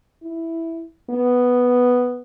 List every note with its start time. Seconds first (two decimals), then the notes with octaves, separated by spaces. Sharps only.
0.23 E4
1.10 B3